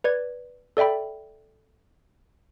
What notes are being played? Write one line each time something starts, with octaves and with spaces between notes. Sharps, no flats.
B4 D5 G#6
A4 D5 E5 G5 B5